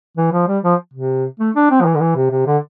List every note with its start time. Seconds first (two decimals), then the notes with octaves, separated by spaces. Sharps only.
0.17 E3
0.32 F3
0.48 G3
0.64 F3
0.94 C3
1.40 A3
1.56 D4
1.71 C4
1.81 F3
1.86 E3
1.95 D3
2.00 E3
2.16 C3
2.31 C3
2.47 D3